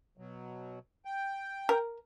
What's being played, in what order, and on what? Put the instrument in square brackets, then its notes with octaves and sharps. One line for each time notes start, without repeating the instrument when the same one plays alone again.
[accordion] B2 F#3
G5
[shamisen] A#4